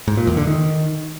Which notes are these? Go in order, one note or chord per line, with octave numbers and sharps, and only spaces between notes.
G#2
A#2
E2
D3
D#3